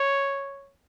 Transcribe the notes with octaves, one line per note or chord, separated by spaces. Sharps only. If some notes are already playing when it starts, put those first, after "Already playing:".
Already playing: C#5